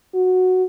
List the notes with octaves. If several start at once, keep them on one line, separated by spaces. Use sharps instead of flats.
F#4